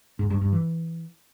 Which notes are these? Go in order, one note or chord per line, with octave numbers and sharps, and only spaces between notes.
G#2
G2
G2
E3